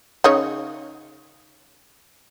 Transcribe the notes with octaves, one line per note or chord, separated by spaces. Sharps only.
C#3 D#4 C#5